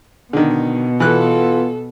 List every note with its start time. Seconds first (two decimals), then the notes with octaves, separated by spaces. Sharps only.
0.33 B2 D3 D#3
1.00 E3 B3 F4 A4 F#6